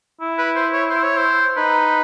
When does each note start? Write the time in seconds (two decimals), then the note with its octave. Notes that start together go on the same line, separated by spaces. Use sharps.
0.21 E4
0.39 B4
0.55 C5
0.72 C#5
0.90 C5
1.03 C#5
1.17 C5
1.57 D#4 B4